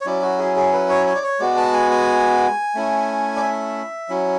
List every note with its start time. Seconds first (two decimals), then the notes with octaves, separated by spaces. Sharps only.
0.01 C#5
0.06 F#3 C#4 E4 D5
0.22 F#4
0.39 G#4
0.56 G#4
0.73 B4
0.89 C#5
1.07 C#5
1.15 D5
1.23 C#5
1.40 G#3 B3 F#4 D5
1.57 A5
1.74 G#5
1.91 G#5
2.75 A3 C#4 E4
3.36 D5
3.42 E5
4.09 F#3 C#4 E4